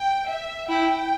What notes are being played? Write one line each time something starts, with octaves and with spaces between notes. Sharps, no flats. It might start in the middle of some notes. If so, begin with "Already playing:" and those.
Already playing: G5
E5
E4 G5